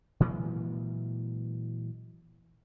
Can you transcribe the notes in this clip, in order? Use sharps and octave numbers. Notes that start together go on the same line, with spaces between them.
A#2 E3 F#3 G#3